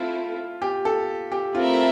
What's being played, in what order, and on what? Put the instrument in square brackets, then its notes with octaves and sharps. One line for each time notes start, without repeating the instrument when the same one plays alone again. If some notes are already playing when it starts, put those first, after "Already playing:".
Already playing: [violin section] A3 C4 E4 A4 [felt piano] F4
[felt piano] G4
A4
G4
[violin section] A3 C4 E4 A#4 E5 [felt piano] F4